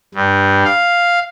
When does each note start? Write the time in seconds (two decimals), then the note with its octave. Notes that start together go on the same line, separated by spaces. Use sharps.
0.15 G2
0.65 F5